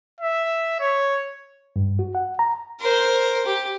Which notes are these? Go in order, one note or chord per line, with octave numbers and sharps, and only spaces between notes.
E5
C#5
G2
F#4
F#5
A#5
A#4 C5
G4